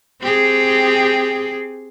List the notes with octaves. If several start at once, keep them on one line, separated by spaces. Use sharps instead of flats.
C4 G4 G#4